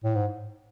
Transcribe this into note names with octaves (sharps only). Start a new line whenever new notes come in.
A2
G#2